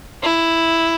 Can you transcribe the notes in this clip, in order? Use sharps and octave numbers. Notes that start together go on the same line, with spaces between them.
E4